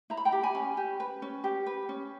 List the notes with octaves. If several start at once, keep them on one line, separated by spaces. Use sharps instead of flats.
E4 A#5
B5
G5 A#5
G4
G#5 B5
C#4
G4
B4
C#4
G4
B4
C#4